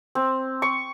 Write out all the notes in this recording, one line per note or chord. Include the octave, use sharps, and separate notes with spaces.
C4
C#6